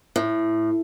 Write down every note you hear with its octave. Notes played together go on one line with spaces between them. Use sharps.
A2